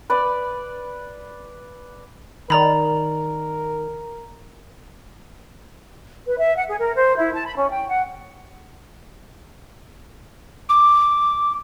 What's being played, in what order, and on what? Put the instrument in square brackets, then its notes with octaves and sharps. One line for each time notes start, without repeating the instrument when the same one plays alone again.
[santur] B4 D5
[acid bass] D#3 [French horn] A#4 [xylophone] D5 A#5 B5
[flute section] B4
E5
F#5
G#4
A#4
C5
E4
A5
B5
C#4
G5
F#5
[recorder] D6